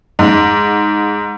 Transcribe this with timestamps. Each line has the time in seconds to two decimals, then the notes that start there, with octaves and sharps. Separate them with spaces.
0.19 G#2